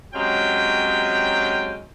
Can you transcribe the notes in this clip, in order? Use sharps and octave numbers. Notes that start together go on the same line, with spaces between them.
C3 F#3 G#3 C#4 F4 G5